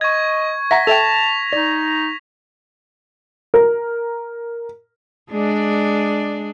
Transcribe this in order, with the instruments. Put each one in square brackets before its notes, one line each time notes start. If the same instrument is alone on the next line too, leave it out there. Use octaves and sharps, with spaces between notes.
[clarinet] D#5 [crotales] C#6 G#6
[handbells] E5 F#5 A#5 [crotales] A#6 B6
[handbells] A4 E5 G5 [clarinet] A5 [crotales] F7
[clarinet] D#4 [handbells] D5
[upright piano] A#4
[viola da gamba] G#3 D4 D5